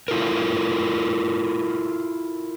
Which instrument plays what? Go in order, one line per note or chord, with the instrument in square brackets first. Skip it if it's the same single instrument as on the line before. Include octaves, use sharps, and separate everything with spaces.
[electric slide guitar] E4 F4 A4 A#4